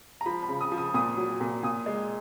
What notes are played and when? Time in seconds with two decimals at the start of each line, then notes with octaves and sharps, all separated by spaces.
0.21 A#5
0.26 F3 B5
0.43 B5
0.49 C#3
0.61 D#6
0.72 F3
0.78 D#6
0.94 A#2 D#6
1.17 F#3
1.41 A#2
1.63 A#2 D#6
1.86 G#3